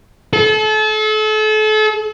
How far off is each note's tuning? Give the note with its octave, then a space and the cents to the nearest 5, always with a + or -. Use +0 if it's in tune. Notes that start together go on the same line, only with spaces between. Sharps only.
A4 -35